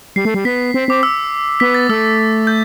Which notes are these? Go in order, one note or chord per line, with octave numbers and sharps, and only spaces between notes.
G3 C7
A3
G3
B3 B6
C4
C4 D6
E6
B3 B6
A6
A3 E6
G6